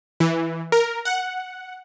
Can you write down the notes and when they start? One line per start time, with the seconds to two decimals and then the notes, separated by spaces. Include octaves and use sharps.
0.20 E3
0.72 A#4
1.05 F#5